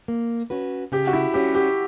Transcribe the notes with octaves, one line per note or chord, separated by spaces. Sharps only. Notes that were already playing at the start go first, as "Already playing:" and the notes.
A#3
C#4 F#4 B4
C#3 G4
F#4
E4
G3 C#4 F#4 G4
G4